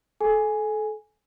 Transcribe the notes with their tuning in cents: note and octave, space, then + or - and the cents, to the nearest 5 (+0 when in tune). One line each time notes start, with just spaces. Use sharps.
A4 -30 G#5 +0